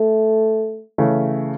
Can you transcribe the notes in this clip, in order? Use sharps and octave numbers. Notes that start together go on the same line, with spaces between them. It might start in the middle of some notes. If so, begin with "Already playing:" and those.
Already playing: A3
C#3 E3 A3